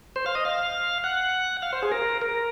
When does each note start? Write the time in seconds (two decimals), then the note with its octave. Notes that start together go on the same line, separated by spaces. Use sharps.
0.16 C5
0.26 F5
0.35 D#5
0.45 F5
1.04 F#5
1.62 F5
1.73 C5
1.83 G#4
1.92 A#4
2.22 A#4